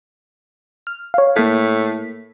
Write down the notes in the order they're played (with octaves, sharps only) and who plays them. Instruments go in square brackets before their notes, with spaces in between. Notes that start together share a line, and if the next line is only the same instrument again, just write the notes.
[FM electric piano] F6
C#5 F5
[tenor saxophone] A2 [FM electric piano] A#3 B6